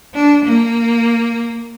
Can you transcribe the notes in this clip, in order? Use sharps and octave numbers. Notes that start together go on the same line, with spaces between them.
D4
A#3